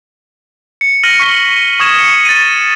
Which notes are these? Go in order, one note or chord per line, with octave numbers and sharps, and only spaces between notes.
C#7
F6 A#6 D#7 F#7
C#6 F6 B6 C#7 G7
C#6 D#6 G#6 E7
C#7
A6 C#7 D#7